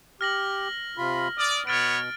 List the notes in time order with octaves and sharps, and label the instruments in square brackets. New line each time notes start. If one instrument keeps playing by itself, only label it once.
[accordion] G4 [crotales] F6 A#6 F#7
[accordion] C3 F4 B5
[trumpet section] D5 [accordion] D#6 F6
[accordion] B2 [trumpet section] B3 C#5 [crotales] F6 A6 D7